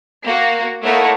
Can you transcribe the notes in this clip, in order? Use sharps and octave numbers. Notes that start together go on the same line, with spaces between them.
A#3 F#4
A3 A#3 D#4 E4 C#5 F#5